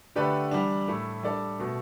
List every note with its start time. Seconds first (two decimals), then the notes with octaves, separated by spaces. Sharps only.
0.16 D3 A3 G4 B4 D5
0.51 E3 G3 D4
0.88 A2 A3 E4
1.23 G3 D4 A4 D5
1.60 B2 A3